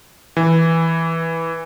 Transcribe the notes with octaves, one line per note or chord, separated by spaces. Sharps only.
E3